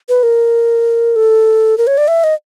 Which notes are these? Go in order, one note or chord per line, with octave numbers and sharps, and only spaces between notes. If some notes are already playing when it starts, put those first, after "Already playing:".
B4
A#4
A4
A#4
C#5
D5
E5
D#5